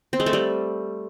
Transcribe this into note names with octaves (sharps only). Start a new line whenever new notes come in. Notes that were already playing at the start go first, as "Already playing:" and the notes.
C4
G#3
A3
G3